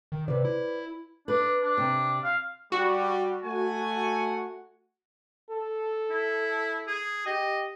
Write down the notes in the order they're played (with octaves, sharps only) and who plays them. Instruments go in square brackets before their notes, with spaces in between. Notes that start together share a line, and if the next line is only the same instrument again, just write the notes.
[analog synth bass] D#3
[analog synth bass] C3 [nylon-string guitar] B4 C5 D5
[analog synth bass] E4
[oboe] D4 [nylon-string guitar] B4
[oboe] D4
[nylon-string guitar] C3
[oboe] F5
[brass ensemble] G3 [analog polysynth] F#4
[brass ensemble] A3 F#5 G#5
[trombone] A4
[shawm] E4
G#4
[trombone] G4 [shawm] D#5